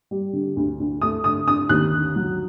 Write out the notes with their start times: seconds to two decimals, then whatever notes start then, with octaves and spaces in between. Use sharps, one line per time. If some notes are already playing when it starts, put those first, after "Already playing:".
0.11 G3
0.33 D3
0.57 D2
0.80 D2
1.01 A3 D#6
1.24 D3 D#6
1.47 D3 D#6
1.69 D#2 F#6
1.93 D3
2.16 F#3